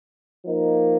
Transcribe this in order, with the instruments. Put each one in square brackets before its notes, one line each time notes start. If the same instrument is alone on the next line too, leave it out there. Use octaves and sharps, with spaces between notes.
[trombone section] F3 A#3 D#4